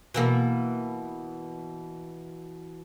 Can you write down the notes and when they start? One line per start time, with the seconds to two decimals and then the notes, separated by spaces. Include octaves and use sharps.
0.14 B2 E3 A#3